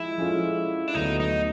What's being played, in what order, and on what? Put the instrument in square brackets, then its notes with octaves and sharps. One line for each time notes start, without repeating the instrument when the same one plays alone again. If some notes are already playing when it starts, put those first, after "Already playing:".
Already playing: [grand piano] F3 G#3 [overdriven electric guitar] E4
[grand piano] F3 G#3 C#4 F4 A4
[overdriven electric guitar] D4
[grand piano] D2 D3 F#3 B3 [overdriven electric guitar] D#4
[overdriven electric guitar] D#4